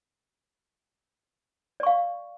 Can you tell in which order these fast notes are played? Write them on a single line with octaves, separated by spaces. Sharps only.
D5 C#6 F5